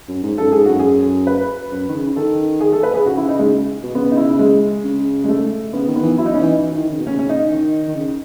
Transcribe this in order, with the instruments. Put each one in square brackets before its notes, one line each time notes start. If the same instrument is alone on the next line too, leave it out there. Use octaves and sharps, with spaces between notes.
[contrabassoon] F#2
G#2
[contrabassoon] F#2 [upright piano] A4
[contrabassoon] G#2 [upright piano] G#4
[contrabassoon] F#2 [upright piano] F#4
[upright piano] G#4
B4
[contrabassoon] F#2
D#3
C#3
[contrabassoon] D#3 [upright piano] A4
[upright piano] G#4
A4
B4
G#4
[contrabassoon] C#3 [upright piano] F#4
[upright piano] E4
D#4
G#3
[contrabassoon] B2
[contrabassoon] C#3 [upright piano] B3
[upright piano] D#4
E4
G#3
[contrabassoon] C#3
[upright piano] G#3
A3
[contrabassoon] C#3 [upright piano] B3
[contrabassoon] D#3
[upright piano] B3
[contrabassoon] E3
[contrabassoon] F#3 [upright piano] E4
[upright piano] D#4
C#4
[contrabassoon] E3 [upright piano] D#4
[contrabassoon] E3
E3
D#3
C#3
B2
[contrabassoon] C#3 [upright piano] C#4
[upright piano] C#4
D#4
[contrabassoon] D#3
D#3
C#3